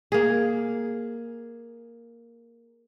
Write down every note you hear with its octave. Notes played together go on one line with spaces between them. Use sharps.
A#3 G#4